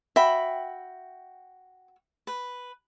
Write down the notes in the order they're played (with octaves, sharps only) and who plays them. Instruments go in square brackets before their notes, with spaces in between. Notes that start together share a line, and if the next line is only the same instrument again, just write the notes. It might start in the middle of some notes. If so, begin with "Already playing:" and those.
[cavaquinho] F#4 G5 B5 [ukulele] E5
[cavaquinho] B4